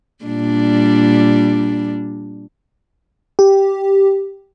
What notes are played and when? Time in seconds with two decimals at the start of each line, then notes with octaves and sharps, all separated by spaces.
0.24 A#2 G3 D4
3.39 G4